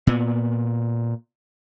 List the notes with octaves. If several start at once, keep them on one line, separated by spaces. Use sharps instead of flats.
A#2 B3